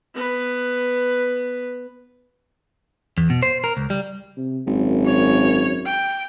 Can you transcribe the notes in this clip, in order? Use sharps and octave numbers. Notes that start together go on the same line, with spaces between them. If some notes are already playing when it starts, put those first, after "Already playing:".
B3 B4
E2
B2
C5
A#4
C#2
G3
C3
G#1 F#2
C#5
G5